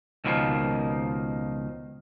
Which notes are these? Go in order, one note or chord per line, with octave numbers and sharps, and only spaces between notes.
C#2 B2 D#3 F3 G3 A#3